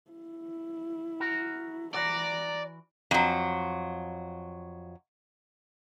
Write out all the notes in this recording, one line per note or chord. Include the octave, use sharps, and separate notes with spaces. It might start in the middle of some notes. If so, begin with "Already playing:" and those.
E4
F#4 A#4
E3 F#4 D5 A#5
F2 F#3